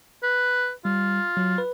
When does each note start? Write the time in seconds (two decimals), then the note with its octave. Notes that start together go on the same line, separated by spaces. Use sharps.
0.23 B4
0.85 G3 F4
1.37 F#3
1.58 B4